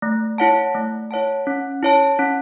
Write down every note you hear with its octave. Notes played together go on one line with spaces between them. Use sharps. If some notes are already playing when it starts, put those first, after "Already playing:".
A3
E4 C#5 F#5 A5
A3
E4 C#5 F#5 A5
C#4
E4 C#5 A5
C#4